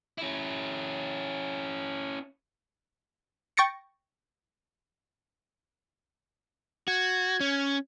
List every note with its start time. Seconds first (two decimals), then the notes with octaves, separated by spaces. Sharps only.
0.18 C#4 E4
3.57 G5 C#6 A6 A#6 C#7 D7
6.88 F#4 G#6
7.40 C#4